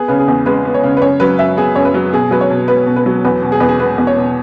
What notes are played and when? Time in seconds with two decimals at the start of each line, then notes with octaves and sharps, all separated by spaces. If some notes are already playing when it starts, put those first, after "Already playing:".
Already playing: B3 G#4
0.08 C#3 B4
0.19 G#4
0.28 E2
0.46 G#3 B4
0.65 B3
0.74 C#5
0.83 C#3
0.97 B4
1.02 F#2 C#5
1.20 F#3 B4
1.39 F#2 E5
1.57 B3 G#4
1.76 F#2 C#5
1.85 B4
1.94 F#3
2.13 B2 G#4
2.31 F#3 B4
2.41 C#5
2.50 B2
2.68 B3 B4
2.86 B2
2.96 B4
3.06 F#3
3.25 E2 B4
3.42 B2
3.52 G#4
3.60 E2 B4
3.69 G#4
3.80 B3 B4
3.98 E2
4.07 C#5
4.16 B2